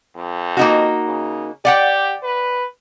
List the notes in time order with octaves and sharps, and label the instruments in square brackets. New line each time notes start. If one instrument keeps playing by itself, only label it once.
[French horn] F2
[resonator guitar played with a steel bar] A#3 D#4 F#4
[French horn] C#3
[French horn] G4 [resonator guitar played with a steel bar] D5 F#5 G5
[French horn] B4